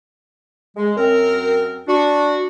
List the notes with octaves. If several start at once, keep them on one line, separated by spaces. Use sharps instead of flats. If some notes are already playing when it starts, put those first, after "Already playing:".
G#3
F#2 C4 A#4
D4 F#4